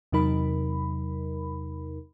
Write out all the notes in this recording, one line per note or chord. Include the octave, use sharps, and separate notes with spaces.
E2 C3 F#3 D#4 A#4 B5